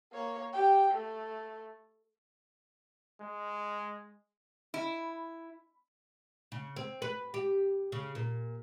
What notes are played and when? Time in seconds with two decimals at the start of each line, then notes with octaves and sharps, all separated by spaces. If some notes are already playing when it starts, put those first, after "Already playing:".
0.13 A#3 C#5
0.53 G4 G5
0.91 A3
3.21 G#3
4.74 E4
6.52 C#3
6.76 C4
7.02 B4
7.34 G4
7.92 C#3
8.15 A#2